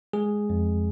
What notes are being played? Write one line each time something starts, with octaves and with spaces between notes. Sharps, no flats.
G#3 G#4
F2